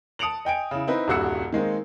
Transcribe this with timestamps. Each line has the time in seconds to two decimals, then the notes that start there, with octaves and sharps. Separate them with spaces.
0.19 A5 D#6 C#7 D7 F7 F#7
0.45 D#5 G5 G#5 D7
0.71 C#3 E4
0.87 C4 D#4 E4 B4
1.08 D#1 C2 G2 F#4 E6 C#7
1.53 D#3 G#3 A#3 C4